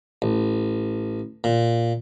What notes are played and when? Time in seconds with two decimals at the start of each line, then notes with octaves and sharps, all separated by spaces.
0.22 A1
1.44 A#2